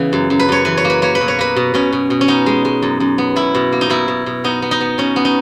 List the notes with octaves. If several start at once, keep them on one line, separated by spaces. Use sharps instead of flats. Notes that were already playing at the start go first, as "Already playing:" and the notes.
Already playing: C#3 E3 B3 B4
F#2
F#2
B4
F#2 C#5
E3 B4
C#5
A#3
B4
A#3 C#5
B4
B2
C#5
A#3 B4
B2
B2 C#4
B2
B2
C#4
B3 D#4
G#3
G#3
F#2
F#2
B3
B2 E4
B2
A#3
D#4
B2 E4
B2
B2
B3 D#4
B3
D#4
B3
B2 C#4
B3
D#4